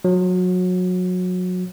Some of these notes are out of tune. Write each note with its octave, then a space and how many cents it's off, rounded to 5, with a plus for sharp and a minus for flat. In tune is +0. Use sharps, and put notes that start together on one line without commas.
F#3 -25